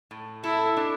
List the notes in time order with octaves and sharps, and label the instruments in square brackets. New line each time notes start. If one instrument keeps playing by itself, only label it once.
[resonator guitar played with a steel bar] A2
[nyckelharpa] E4 [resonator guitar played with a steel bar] A4
[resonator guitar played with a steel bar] D4